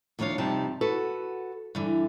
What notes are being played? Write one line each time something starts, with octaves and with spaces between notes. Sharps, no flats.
D#2 F3 D4 C#5 F5
G2 C3 F3 D#4 G4 A5
F#4 A4 B4
G2 D3 E3